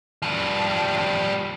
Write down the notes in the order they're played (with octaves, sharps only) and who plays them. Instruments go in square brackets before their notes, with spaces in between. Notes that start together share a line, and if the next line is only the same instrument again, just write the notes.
[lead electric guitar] F3 G3